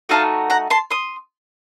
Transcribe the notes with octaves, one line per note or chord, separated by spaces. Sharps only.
A3 D#4 F#4 F5 A5
F#5 A#5
A5 C6
C6 D#6